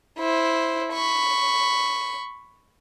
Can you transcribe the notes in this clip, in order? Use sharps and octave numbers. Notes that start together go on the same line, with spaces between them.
E4 C5
B5 C#6